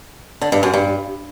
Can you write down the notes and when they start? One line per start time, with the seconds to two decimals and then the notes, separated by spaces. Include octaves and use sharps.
0.41 D3
0.52 G2
0.63 F#2
0.74 G2